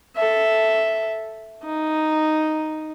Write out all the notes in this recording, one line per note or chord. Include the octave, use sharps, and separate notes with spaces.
A4 E5
D#4